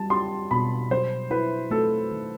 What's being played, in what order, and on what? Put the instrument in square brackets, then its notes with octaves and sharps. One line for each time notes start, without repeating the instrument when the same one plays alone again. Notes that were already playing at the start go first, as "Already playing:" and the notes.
Already playing: [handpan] G3 [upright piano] A5
[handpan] G4 [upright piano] C6
[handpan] B2 [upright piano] B5
[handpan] F#3 [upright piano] C5
[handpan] E4 [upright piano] B4
[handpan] A3 [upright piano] A4
[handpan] D#3